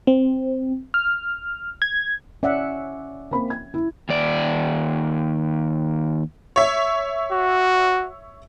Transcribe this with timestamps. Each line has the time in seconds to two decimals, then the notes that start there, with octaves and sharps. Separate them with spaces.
0.07 C4
0.94 F6
1.82 G#6
2.43 C#4 D5 E5 F#5
3.31 A#3 C4 B5
3.50 G#6
3.74 E4
4.09 D#2 D5
6.56 C#5 E5
7.33 F#4